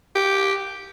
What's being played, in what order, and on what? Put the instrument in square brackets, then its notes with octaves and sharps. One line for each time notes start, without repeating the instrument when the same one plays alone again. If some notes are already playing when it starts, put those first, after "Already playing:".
[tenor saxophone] G4